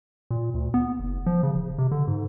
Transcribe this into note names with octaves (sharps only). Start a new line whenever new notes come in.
A#2
D2
B3
F#1
F3
C#3
D1
C3
D3
G#2